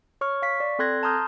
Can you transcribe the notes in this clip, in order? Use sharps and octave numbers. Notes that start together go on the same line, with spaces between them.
C#5 C#6 F6
F5 C#6 B6
D5
C4 A4 C6 F#6 G#6 A#6
A5 A#5 C6 D#6 F6 G6